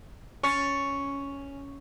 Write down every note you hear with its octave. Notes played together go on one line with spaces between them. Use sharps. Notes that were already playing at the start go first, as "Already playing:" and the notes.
C#4 C#6 A6